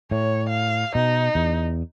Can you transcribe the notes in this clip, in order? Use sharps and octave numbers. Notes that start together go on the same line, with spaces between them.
A2 C#5
F5
B2 D#4
E2